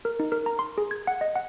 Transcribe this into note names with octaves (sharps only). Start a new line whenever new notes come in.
A#4
D#4
A#4
A#5
C6
G#4
G#6
F#5
D#5
F#5